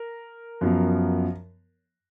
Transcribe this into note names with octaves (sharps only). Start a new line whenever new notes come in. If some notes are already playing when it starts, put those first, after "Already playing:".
Already playing: A#4
F#2 F3 B3